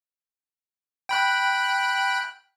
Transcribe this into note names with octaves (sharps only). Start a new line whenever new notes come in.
G5 B5 F#6